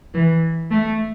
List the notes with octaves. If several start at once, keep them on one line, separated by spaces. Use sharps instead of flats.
E3
A3